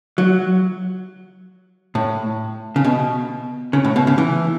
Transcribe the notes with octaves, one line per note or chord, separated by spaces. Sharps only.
F#3
A2
C#3
B2
C#3
A2
B2
C#3
E3